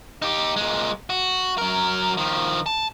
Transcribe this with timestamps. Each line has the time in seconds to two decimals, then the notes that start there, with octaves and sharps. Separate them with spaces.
0.22 D#4 G4
0.56 A#2 G#3
1.10 F#4
1.58 F#3 A#4
2.17 D#3 F3
2.66 A5